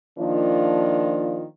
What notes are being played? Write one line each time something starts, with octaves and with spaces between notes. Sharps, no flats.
D#3 F3 A#3 D4 F4